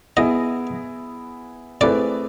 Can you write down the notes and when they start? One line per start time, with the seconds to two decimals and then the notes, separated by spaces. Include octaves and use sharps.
0.17 B3 E4 G#4 D#5
1.81 A3 C4 E4 G#4 B4 D5